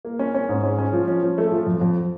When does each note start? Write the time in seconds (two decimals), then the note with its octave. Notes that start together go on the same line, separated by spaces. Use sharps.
0.05 A#3
0.19 C#4
0.34 C#4
0.49 G#2
0.64 C#4
0.78 C#4
0.93 F3
1.08 C#4
1.23 F3
1.38 A3
1.52 F3
1.66 F2
1.81 F2